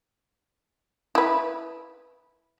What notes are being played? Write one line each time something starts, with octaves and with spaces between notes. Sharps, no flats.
E4 B4